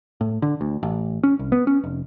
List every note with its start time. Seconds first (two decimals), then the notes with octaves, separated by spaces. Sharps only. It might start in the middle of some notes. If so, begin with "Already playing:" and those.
0.21 A2
0.42 D3
0.61 D2
0.83 A1
1.23 C#4
1.39 C2
1.52 B3
1.67 C#4
1.84 F1